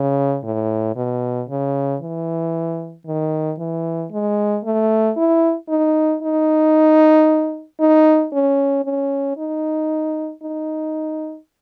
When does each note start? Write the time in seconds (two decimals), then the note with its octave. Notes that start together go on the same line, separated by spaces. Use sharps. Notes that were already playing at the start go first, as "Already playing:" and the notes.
Already playing: C#3
0.44 A2
0.96 B2
1.49 C#3
2.02 E3
3.06 D#3
3.59 E3
4.12 G#3
4.65 A3
5.17 E4
5.69 D#4
6.23 D#4
7.81 D#4
8.33 C#4
8.85 C#4
9.38 D#4
10.43 D#4